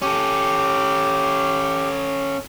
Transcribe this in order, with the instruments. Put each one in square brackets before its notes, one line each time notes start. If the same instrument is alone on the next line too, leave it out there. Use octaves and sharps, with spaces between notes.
[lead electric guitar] C#4 A4 [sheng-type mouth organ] G4